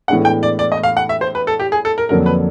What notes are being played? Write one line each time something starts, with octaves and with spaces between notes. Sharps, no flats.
A2 E3 G#3 B3 D4 F#5
G5
D5
D5
D#5
F5
F#5
E5
C5
B4
A4
G4
G#4
A4
A#4
F2 D3 F#3 A#3 D4 A#4
B4